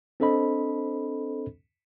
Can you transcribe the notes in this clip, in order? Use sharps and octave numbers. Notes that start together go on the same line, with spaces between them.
C4 D4 A4 C5 D#5 B5